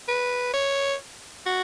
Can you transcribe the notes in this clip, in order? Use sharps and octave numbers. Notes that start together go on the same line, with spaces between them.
B4
C#5
F#4